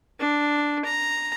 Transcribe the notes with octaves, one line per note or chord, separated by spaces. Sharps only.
D4
A#5